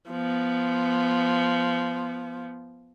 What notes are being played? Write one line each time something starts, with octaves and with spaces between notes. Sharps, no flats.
F3 B3